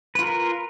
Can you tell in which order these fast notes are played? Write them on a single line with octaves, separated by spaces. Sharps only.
B4 F4 A#4